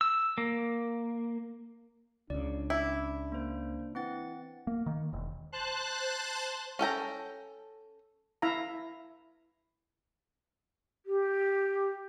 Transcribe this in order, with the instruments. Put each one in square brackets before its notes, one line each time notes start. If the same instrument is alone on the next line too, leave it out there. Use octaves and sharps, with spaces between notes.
[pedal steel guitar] E6
A#3
[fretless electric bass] C#2 C#3 [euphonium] D4 [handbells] D5
[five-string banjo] E4 [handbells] D6
[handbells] A#3 C5
[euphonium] E3 [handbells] C4 F#5 A6
[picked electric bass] A#3
D#3
E1
[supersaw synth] C5 A5 F#6
[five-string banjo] C#4 A4 G5 A#5
[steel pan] E4 E5 F5 A#5
[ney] G4